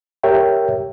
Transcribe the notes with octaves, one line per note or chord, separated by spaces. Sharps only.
G4 A#4 C#5 E5 G5